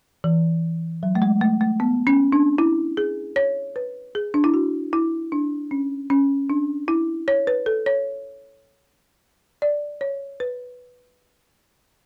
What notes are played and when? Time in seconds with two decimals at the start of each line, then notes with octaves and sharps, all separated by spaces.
0.24 E3
1.03 F#3
1.15 A3
1.22 G#3
1.41 A3
1.61 A3
1.80 B3
2.07 C#4
2.32 D4
2.58 E4
2.97 G#4
3.36 C#5
3.76 B4
4.15 G#4
4.34 D4
4.44 E4
4.54 F#4
4.93 E4
5.32 D4
5.71 C#4
6.10 C#4
6.50 D4
6.88 E4
7.28 C#5
7.47 B4
7.66 A4
7.86 C#5
9.62 D5
10.01 C#5
10.40 B4